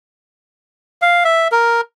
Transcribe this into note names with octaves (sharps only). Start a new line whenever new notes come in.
F5
E5
A#4